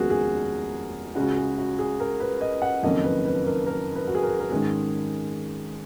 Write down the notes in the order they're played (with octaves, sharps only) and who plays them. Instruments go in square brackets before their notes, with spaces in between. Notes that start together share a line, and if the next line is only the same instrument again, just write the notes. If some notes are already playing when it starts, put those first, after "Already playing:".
Already playing: [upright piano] F1 D#2 C#3 G#3 B3 F#4 G#4 A#4
G#4
C#2 C#3 G#3 C#4 F#4
G#4
F#4
G#4
A#4
B4
D#5
F#5
F#1 F2 D#3 A#3 C#4 D#5
B4
B4
A#4
A#4
B4
F#4
G#4
A#4
A#4
G#2 D#3 G#3 C#4 G#4